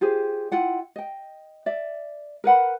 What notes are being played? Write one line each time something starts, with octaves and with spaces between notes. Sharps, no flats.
F4 G4 G#4 C5
E4 F4 F#5 G5
D#5 G5
D5 E5
A#4 B4 F#5 B5